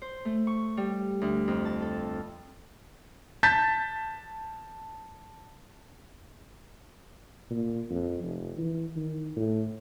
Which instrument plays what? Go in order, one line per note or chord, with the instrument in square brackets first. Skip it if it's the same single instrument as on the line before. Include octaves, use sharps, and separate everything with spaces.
[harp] C5
A3
C#6
G3
D2
F2
A5
A4
[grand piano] A5 G6 A6 B6
[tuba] A#2
F2
F1
E3
D#3
A2